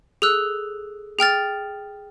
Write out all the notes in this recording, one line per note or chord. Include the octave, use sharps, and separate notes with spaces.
G#4 A4 E6 F#6
G#4 G5 F6 A6